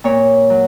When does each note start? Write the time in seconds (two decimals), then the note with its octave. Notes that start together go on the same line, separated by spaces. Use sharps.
0.04 A#2 C#5
0.50 F#3